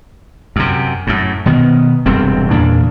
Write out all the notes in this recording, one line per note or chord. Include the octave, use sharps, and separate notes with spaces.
F#2 C3
F#2 A2
B2 D#3 B3
E1 G2 C3 C4
E2 A#2 C#3 D4